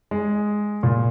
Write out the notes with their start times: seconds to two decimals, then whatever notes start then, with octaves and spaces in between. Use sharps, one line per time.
0.11 G#3
0.83 A#2